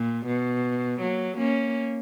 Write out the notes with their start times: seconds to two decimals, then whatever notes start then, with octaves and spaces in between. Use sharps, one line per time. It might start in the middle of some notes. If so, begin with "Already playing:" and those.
Already playing: A#2
0.26 B2
1.00 F#3 A#3
1.37 A#3 C#4